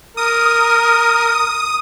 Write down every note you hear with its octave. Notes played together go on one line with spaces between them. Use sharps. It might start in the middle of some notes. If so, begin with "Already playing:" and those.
A#4 D#6